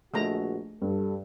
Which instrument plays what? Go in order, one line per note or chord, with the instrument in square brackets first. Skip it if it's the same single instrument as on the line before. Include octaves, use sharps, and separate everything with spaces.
[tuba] A#1 [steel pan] G#3 A3 A#5 [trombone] F#4
[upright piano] G2 [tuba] G3 [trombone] A4